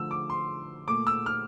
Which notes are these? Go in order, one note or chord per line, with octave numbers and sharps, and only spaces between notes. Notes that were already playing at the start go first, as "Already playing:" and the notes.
Already playing: D3 F3 A3 E6
D6
C6
A#2 A3 D6
E6
F6